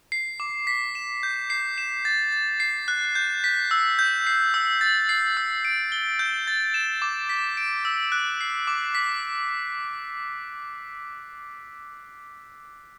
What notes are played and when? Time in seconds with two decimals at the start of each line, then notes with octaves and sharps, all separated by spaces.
0.12 C7
0.40 D6
0.67 B6
0.95 E7
1.23 G6
1.50 C7
1.78 E7
2.05 A6
2.32 A6
2.60 C7
2.88 F#6
3.15 G6
3.44 B6
3.71 E6
3.99 G6
4.27 C7
4.54 E6
4.81 A6
5.09 C7
5.37 E6
5.65 D7
5.92 G7
6.19 G6
6.47 A6
6.74 E7
7.02 D6
7.29 B6
7.57 D7
7.85 E6
8.12 F#6
8.41 C7
8.67 D6
8.95 B6